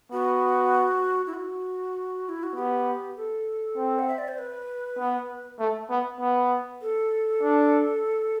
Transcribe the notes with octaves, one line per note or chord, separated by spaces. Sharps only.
B3 F#4
E4
F#4
E4
F#4
B3 G4
A4
C4
F#5
E5
D5
C5
B4
B3
A3
B3
B3
A4
D4